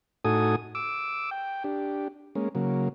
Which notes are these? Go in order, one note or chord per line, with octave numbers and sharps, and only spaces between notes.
A2 D#4 F#4 A4 G#5 D#6
D6 E6
G5
D4 G4
G#3 A#3 C#4
C#3 F#3 A#3